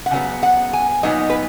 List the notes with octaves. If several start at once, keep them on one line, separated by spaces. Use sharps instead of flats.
F#5
C#3 F#3 B3
F#5
G#5
A#2 F#3 B3 D#4 D#5
B4